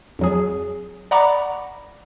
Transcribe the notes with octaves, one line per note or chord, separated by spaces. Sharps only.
F2 F#3 G#4
D5 F#5 A#5 B5 C#6 D6